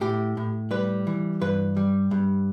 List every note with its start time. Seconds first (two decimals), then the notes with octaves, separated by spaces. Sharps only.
0.01 A2 G4
0.37 A2
0.71 G3 B4
1.07 E3
1.41 G2 B4
1.77 G3
2.11 G2